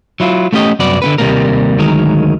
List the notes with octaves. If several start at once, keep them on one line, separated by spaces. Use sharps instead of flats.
F#3 E4 F4
A3 B3 C#4 G4 D#5
C2 F#2 B3 F#4 B4 D5
D3 C#4 B4
D#2 C3 G3 A3 A#3 A#4
D2 D#3 F#3 G#3 A#4